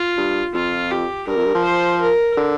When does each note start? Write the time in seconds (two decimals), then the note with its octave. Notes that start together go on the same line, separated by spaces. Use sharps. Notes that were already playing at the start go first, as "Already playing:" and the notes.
Already playing: F4
0.17 G2
0.54 F2 F4
0.91 G4
1.27 G2 A#4
1.36 F2
1.45 G2
1.55 F3
1.64 C5
2.01 A#4
2.37 D3